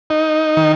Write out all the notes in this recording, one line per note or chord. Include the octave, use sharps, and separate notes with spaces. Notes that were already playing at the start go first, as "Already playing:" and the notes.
D#4
D#3